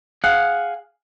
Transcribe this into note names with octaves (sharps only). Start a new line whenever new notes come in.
G#4 F5 F#5